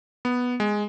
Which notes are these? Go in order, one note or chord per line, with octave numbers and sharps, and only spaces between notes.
B3
G#3